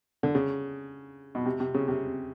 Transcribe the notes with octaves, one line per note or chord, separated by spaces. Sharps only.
D3
C#3
B2
C3
C3
C#3
C3